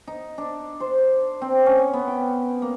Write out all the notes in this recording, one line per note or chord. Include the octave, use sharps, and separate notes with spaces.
D#4
D4
C5
C4
C#4
B3
G5
A#3